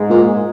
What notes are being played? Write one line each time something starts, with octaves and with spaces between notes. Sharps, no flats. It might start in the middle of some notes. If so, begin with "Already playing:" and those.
Already playing: G#2 G#3
A#2